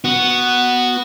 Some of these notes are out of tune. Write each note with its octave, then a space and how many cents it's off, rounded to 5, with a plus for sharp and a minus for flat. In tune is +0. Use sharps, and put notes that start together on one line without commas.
B3 +0 F#4 +0